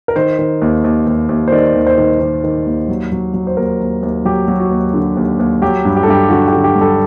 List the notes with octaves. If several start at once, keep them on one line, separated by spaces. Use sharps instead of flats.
A#4
D#3 C5
D#3
D#2
D#2
D#2
D#2
C5
D#3 D5
D#2
C5
D#3
D#3
D#3
D#2
F#3
F#3
F#3
C5
D#2 A#4
D#2
D#2
F#3 G4
F#3
F#4
D#2
D3
D#2
D#2
F#3 G4
G2
G4
A4
G2 G4
D3 F#4
G4
D3
G4
G2
A4